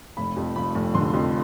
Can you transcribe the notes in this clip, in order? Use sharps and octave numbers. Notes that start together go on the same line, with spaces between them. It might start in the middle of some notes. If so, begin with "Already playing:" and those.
F1 B5
F2
F1 B5
F1
D3 C6
F2